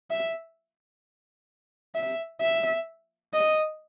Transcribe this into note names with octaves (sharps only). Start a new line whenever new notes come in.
E5
E5
E5
D#5